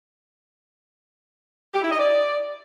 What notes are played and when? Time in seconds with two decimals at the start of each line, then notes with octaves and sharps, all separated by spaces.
1.73 G4
1.81 E4
1.90 D#5
1.98 D5